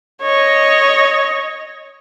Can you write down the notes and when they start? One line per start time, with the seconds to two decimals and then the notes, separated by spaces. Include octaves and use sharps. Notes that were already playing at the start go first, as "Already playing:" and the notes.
0.22 C#5 D#5